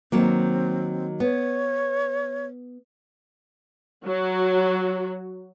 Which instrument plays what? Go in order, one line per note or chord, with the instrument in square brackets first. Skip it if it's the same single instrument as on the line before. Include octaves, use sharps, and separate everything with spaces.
[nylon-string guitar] D#3 F#3 A#3 [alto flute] C4
[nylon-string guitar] B3 [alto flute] C#5
[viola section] F#3 F#4